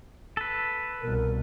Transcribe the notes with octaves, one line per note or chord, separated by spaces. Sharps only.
A4 B4
C2 B2 A#4